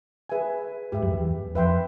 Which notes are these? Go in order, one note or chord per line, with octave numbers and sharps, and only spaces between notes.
G#4 B4 E5 G#5
G#2 G4 B4 E5
F#2
E2
F2 B4 E5 G5 C6